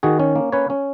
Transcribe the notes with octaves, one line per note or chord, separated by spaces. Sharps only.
D#3 F#4 G#4
C#4
A#3
C#4 B4 C#5
C#4